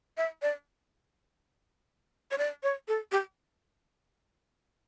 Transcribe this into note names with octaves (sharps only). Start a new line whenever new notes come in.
E5
D5
C#5
D5
C#5
A4
G4